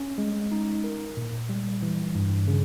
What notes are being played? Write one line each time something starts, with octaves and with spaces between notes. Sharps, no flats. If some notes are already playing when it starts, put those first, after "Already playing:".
Already playing: C#4
G#3
D#4
A#4
A#2
G3
E3
G2
C#3